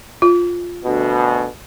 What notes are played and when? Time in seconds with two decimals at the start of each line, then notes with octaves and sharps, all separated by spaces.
0.22 F4
0.85 D2 B2